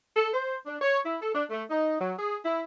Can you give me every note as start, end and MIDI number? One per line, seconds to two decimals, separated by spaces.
0.16 0.30 69
0.34 0.57 72
0.66 0.77 62
0.81 0.99 73
1.05 1.16 64
1.21 1.33 69
1.35 1.44 62
1.50 1.63 57
1.70 1.98 63
2.00 2.14 54
2.19 2.36 68
2.45 2.63 64